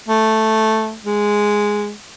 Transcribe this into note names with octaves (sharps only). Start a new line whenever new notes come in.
A3
G#3